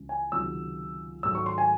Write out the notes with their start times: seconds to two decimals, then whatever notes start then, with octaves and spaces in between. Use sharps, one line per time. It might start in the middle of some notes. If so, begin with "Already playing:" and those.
Already playing: C#2 C#3 E3 G#3
0.09 G#5
0.32 C#2 C3 D#3 F#3 E6
1.23 G#1 G#2 F#3 A3 E6
1.35 C#6
1.46 C6
1.58 G#5